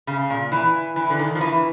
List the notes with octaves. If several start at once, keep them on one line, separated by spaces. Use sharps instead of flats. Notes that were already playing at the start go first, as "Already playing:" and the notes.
C#3
A#2
E3
E3
D3
D#3
F3
E3